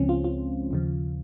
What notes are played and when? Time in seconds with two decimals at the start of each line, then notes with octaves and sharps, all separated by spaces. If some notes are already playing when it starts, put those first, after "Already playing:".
Already playing: C#2 C#3 F3 G#3 C4 C#4
0.09 F4
0.24 F4
0.71 D#2 C#3 F3